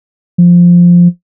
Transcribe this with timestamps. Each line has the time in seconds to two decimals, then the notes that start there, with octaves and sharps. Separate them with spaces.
0.38 F3